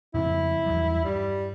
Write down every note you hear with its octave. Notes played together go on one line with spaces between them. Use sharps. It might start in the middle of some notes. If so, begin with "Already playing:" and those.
F2 C#3 C4 E4
E2 F#3 G3
G2 G3